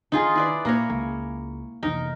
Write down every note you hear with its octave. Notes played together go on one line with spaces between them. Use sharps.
D3 D#3 D#4 F4 G#4
E4 B4 D5
A#2 A#3 A#4 C#5
C#2
F1 E3 D#4 A#4